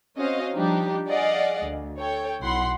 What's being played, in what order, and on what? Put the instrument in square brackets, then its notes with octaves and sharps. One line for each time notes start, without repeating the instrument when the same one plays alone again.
[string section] C4 C#4 F#4 C5 D#5 F5
F3 G3 D4 D#4 G4
G#4 D5 D#5 F5 F#5
D2
A4 C#5 G5
B1 E4 F#5 B5 C6